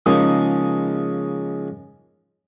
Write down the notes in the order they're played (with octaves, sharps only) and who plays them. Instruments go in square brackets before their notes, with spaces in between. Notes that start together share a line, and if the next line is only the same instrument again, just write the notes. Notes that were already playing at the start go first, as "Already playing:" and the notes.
[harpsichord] C#3 F3 G#3 A#3 C#4 D#4